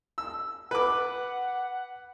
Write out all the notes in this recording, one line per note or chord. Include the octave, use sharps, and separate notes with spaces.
E6
B4 F#5 D6